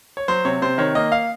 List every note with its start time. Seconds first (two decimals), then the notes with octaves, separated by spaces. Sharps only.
0.17 C#5
0.28 F#3 C5
0.45 C3 C#5
0.62 C3 C5
0.78 D#3 C#5
0.95 A#3 D#5
1.12 F5